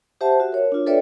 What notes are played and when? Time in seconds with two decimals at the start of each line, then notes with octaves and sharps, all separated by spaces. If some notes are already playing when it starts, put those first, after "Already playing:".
0.21 G4 C5 E5 F#5 A5
0.40 F#4 E5
0.53 A#4 C#5
0.72 D4 F4
0.86 A4 B4 C#5 D5 E5 G5